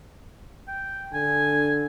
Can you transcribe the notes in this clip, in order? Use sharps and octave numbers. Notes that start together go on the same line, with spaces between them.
G5
D3 G#5